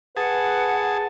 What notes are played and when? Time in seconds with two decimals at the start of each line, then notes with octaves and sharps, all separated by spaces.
0.17 G#4 B4 F#5 A5